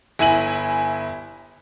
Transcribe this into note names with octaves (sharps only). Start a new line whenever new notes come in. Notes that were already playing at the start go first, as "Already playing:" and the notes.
G1 E4 G#5 D#7 F#7